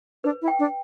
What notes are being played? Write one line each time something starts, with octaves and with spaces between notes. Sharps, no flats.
D4 B4
E4
G5
D4